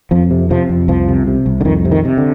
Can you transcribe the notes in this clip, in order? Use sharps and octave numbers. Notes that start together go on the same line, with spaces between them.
F2 F3
C3
C3 F3
F2
C2 F3
C3
C3
C2
D3
F2 D#3
C3
D#3
C3
D3